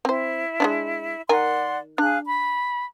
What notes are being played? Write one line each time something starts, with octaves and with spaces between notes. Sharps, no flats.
C4 E4 C5
G#3 C#4 D4
D#3 A#4 D5 F#5 G#5 C6
D4 G#4 F5 F#6
B5